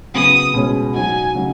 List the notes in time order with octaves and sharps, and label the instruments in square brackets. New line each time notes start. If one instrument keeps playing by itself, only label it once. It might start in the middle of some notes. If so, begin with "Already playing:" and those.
[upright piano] C#3 F#3 B3 [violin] D#6
[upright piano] B2 G#3 C#4 G#4
[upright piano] F#3 D#4 F#4 [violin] G#5
[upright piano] C#3 F#3 D#4 F#4